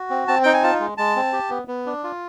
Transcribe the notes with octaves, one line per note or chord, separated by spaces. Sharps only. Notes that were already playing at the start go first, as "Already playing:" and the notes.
Already playing: F#4
C4
C4 A5
D#4 G5
G#5
F4 A5
G#3
G#3 A5
C4
G4
B3
B3
D4
F4